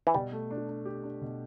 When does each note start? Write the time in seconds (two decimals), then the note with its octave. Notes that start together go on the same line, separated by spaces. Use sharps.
0.07 E3
0.14 B2 G3
0.32 A3
0.51 D4
0.69 D4
0.85 G4
1.03 D4
1.22 B2